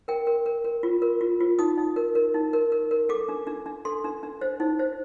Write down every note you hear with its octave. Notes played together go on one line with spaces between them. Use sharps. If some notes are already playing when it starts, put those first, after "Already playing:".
A#4 G5
A#4
A#4
A#4
F4
A#4
F4
F4
D#4 D#6
D#4
A#4
A#4
D#4
A#4
A#4
A#4
A4 D6
D4
D4
D4
A4 C6
D4
D4
C5
D#4
C5